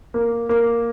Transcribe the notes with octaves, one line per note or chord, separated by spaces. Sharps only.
A#3
A#3